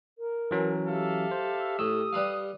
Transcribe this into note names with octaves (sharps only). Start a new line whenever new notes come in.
A#4
E3 F#3 C#4
G4 A4 E5 F5
C5
A2 D#6 E6
G3 B4 F5